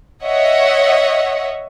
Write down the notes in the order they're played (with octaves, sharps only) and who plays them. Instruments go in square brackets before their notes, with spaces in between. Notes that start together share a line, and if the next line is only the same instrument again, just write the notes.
[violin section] C#5 D#5 E5 F#5